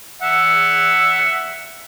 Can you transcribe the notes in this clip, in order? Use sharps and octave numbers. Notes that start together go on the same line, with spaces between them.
E5 F#5